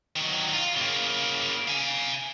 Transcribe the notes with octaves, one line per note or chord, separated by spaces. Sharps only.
D#3 F#3
F4
C#3 A#3
F5 G#5